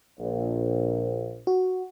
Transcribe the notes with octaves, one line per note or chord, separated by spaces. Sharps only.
A#1
F#4